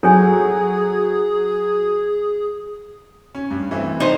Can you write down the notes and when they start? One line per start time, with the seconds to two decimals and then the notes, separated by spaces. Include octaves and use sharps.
0.03 F#3 G#4 A4 C#5 G#5
3.35 C#4
3.50 G2
3.71 E3 A3 C4
4.00 D#4 C5